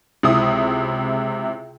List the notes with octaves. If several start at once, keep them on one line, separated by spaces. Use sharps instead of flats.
C#2 C3 E4 D#6